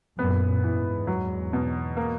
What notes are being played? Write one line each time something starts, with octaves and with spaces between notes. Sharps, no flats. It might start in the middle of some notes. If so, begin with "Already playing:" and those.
F#2 A#2 B3
E2 G#2 E3
F#3
B2
A#3